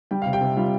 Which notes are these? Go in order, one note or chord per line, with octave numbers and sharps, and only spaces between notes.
G3 G5
C3 F5
G4 G5
C3
G3 F4 F5